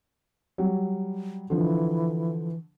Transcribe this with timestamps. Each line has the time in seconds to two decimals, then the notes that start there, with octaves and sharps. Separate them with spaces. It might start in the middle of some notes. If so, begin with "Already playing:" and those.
0.58 F#3 G3
1.50 D3 E3 F3